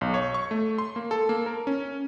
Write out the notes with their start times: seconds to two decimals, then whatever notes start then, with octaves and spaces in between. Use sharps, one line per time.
0.01 B1
0.14 C#5
0.34 C#6
0.51 A3
0.78 C6
0.96 A#3
1.11 A4
1.29 A#3
1.46 A#4
1.67 C#4